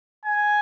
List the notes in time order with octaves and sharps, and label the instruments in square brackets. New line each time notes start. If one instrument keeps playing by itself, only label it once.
[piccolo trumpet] G#5